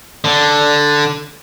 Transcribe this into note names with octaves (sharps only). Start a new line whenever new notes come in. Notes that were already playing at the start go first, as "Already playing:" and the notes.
D3